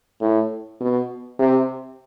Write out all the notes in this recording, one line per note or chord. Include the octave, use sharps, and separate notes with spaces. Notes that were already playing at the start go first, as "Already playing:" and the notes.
A2
B2
C3